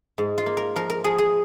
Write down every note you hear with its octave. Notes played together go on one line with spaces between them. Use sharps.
G#2
F4
A#3
A#4
F3 A#4
A#4
F3 G#4
G#4